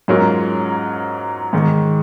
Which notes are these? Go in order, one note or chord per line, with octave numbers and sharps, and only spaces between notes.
G#2 F#3 C#4 F4 A#4
G#2 D#3 G#3